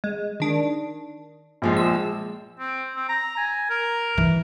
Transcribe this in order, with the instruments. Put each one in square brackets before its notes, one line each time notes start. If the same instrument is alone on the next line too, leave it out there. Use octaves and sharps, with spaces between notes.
[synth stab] G#3
D#3 D4
[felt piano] A#1 F3 G#3
[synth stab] E6
[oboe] C4
C4
A#5
G#5
A#4
[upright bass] E3